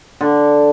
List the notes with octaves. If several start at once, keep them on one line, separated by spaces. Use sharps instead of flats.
D3